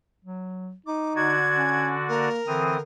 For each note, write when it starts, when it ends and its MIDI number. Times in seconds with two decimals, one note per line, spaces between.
0.25 0.73 54
0.87 1.35 63
0.87 1.14 86
1.16 2.29 50
1.16 2.29 66
1.16 2.29 74
1.16 1.88 92
1.56 1.95 61
2.09 2.40 58
2.09 2.81 70
2.47 2.81 50
2.47 2.77 52
2.47 2.77 60
2.47 2.77 87